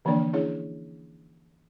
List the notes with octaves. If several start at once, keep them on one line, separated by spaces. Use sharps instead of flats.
D3 E3 F3 A#3 D4 D5
C#4 D4 E4 G#4 C#5